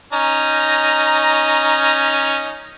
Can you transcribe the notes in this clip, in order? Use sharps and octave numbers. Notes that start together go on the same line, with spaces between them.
C#4 D#4 A#5